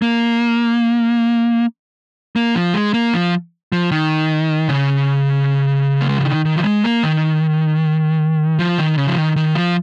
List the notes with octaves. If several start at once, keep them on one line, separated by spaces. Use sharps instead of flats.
A#3
A#3
F3
G#3
A#3
F3
F3
D#3
C#3
A#3
G#3
F3
D#3
D#3
F3
G#3
A#3
D#3
F3
D#3
C#3
F3
D#3
D#3
F3